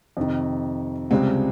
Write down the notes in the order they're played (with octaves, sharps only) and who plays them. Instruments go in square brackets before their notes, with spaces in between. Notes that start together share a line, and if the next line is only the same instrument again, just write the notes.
[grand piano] F2 C3 D#3
[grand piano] C#2 C3 G3 [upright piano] G#3 C4